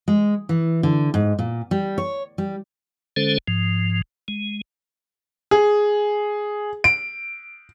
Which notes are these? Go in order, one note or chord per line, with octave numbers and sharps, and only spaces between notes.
G#3
E3
D3
G#2
A#2
G3
C#5
G3
D3 G#3 C#4 A4 C5
G#2 F3
G#3
G#4
D7